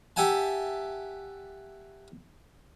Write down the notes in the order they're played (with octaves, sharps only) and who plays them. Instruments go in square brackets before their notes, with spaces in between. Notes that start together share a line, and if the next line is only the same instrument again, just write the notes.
[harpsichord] G4 E5 F#5 G#5 A5